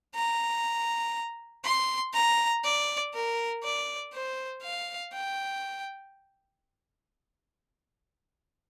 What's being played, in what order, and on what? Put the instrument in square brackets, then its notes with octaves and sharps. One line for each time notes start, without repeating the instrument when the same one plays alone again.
[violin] A#5
C6
A#5
D5
A#4
D5
C5
F5
G5